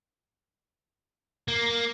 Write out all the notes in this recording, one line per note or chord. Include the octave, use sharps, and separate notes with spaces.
A#3